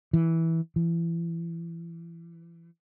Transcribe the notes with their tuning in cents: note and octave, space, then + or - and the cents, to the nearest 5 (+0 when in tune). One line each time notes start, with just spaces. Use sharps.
E3 -10
E3 +30